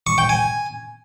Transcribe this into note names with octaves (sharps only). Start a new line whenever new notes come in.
C#6
G5
G#5